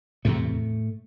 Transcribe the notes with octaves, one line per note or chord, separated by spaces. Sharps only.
E2 A2 C3 A3